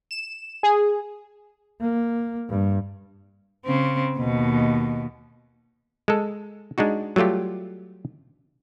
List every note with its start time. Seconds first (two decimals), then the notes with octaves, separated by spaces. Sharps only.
0.11 E7
0.63 G#4
1.81 A#3
2.49 G2
3.65 C#3 C4
4.18 D#2 B2
6.08 G#3 A4
6.78 G#3 D4 D#4 F#4
7.16 F#3 G3 A3 F4 G4